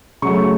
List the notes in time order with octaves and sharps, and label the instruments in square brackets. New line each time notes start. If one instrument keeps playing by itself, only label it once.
[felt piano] C#3 F#3 A3 C#6